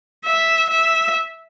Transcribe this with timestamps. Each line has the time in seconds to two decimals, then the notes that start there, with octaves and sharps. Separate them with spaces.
0.26 E5
0.70 E5